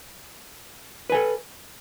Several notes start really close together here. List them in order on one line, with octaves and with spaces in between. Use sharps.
B4 G#5 A4